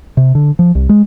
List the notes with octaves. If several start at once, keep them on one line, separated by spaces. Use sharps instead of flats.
C3
D3
F3
C2
G#3